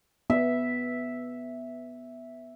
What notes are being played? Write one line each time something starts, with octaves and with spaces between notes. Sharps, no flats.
B3 E5